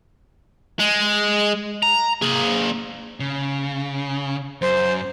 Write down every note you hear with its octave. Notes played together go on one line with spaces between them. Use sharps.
G#3
A#5
A#3 G#4
C#3
F#2 C5